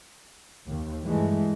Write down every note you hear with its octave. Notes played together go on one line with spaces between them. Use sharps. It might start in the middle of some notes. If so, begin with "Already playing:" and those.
D#2
G2 E3 G#3 A3